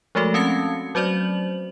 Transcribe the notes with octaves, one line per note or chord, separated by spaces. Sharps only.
F3 G#3 A3 F#4 A4
C4 C#4 F5 A5 G#6 C#7
F#3 F#4 C5 D5 F#7